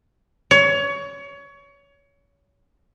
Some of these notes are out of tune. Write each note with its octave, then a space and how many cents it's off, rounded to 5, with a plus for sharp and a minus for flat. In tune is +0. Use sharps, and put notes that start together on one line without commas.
C#5 +25